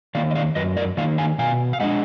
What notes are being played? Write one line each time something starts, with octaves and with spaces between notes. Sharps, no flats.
D#3 A#3 D5 F5
D#5
D5 F5
F#2 B4 D#5
A#4 D5
D#3 A#3 D5 F5
F5 G#5
B2 F5 G#5
F5
G#3 D4 D#5 F#5